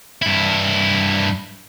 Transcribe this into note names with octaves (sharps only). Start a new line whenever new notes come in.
G2 E4